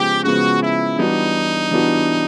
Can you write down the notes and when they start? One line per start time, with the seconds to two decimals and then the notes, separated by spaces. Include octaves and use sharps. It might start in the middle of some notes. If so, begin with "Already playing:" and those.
Already playing: C#3 F3 G#3 B3 G4
0.24 C#3 F3 G#3 B3 F#4
0.61 E4
0.97 E3 G3 B3 D4 D#4 F#4
1.71 E3 G3 B3 D4 F#4